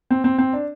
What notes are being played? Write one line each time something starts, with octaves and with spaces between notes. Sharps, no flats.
C4
C4
C4
D4